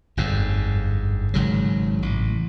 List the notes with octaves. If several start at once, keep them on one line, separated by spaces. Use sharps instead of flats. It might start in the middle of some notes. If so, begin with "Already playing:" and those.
G1 F2 G#2
G#1 G#2 C#3 F#3
A1